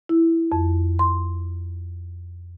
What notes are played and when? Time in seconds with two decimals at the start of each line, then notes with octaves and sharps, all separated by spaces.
0.09 E4
0.52 F2
0.99 C6